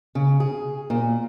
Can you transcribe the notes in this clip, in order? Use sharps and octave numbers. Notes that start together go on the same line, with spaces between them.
C#3
G#4
A#2